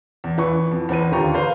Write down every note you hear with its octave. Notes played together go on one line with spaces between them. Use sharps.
E2
E3 B4 C#6
F2
E2 C4 B4 D#7
D#2 D3 F4 G4 A#5 C#6
B4 C5 F5